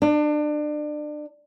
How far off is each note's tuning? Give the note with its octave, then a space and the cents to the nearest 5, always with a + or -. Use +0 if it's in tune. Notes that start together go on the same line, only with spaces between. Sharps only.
D4 +30